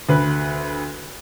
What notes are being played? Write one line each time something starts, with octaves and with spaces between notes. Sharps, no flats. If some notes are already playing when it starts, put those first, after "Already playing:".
D2 B4